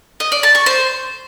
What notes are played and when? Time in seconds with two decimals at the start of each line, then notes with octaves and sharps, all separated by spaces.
0.20 D#5
0.32 D5
0.43 A5
0.55 C#6
0.66 C5